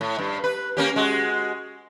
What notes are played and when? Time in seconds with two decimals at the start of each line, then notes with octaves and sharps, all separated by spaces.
0.01 A2
0.19 G2
0.44 B4
0.77 A#3 C#4 G4
0.96 G#3 F#4